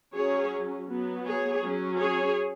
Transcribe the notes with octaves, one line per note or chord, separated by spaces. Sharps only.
F#3 C#4 G#4 C#5
F#3 B3
G#4 C#5
F#3 C#4
G#4 C#5